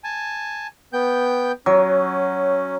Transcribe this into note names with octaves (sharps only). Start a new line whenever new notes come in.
G#5 A5
B3 G5 G6
F#3 C#4